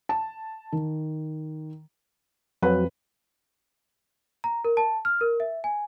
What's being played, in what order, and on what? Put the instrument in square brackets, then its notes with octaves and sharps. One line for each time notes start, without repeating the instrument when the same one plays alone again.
[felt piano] A5
D#3
[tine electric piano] F2 [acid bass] F#3 [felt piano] B4
[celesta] A#5
A#4
A5
F6
A#4
E5
G#5